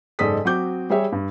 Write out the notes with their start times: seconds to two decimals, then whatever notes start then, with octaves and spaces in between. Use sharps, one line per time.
0.19 F#1 G#2 A4 D5 D#6 B6
0.45 F#3 C4 F#4 D6 G6
0.90 G3 G#4 C#5 E5
1.12 G2